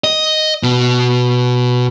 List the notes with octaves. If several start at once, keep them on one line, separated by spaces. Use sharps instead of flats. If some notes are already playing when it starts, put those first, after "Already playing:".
D#5
B2